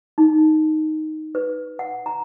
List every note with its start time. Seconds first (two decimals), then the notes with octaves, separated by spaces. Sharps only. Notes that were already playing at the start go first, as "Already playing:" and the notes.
0.18 D#4
1.35 B4
1.79 F#5
2.06 A#5